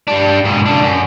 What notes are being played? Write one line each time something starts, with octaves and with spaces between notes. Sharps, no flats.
G3 D4
G#2 B2
C#3 D4
F#2